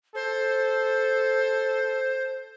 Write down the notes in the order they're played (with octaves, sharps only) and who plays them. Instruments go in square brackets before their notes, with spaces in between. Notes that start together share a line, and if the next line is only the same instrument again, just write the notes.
[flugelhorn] A4 [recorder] C5